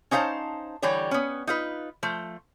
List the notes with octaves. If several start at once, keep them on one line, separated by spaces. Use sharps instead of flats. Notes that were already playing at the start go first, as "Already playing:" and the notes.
C#4 D#4 C5 F5 A5
D3 E3 G3 G4 C#5
B3 C#4
D#4 F4 B4
F3 A3